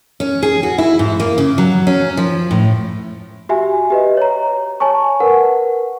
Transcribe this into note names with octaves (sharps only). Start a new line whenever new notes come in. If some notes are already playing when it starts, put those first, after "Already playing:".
C#4
G#4
F#4
E4
G#2
A#3
C#3
F#3
C#4
F3
A2
F#4 G4 E5 G#5
G4 B4 D#5
C#5 A#5
C#5 G#5 A5 C#6
A#4 B4 F#5